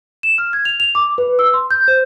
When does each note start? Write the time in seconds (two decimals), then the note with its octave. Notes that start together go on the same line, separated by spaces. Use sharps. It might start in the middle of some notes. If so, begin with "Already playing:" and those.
0.23 E7
0.38 F6
0.53 G#6
0.65 F7
0.80 F7
0.95 D6
1.18 B4
1.39 E6
1.54 C6
1.71 G6
1.88 C5